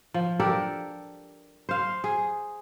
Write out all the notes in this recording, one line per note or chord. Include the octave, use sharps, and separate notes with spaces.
F3
D4 G4 A4 A#4
C5 F5
G#4